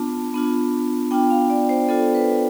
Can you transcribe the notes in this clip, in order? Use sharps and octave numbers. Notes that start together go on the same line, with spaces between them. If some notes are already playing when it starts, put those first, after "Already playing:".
Already playing: B3 D4 F4 A5
B3 D4 F4
B3 D4 F4 G5
F5
D5
C5
B3 D4 F4 A4
B4